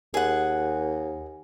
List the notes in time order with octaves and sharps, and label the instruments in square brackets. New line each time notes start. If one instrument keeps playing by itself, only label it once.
[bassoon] D#2 [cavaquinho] G#4 F#5